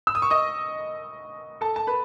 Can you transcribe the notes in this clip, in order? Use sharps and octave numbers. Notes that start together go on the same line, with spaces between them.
E6
D#6
C#6
D#5 D#6
A4 A5
A5
B4 B5